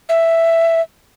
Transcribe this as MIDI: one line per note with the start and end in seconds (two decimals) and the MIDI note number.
0.09 0.81 76